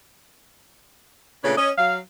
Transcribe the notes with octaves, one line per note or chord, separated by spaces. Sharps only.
A#2 C#3 A3 D4 B4 C#5
C#4 D#5
F#3 F5